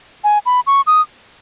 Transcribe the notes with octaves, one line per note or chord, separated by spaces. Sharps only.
G#5
B5
C#6
D#6